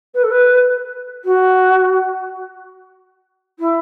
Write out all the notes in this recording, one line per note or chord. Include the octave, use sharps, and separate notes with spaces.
B4
A4
B4
F#4
E4